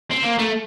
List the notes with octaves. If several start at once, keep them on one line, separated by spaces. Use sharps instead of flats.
C4
A#3
A3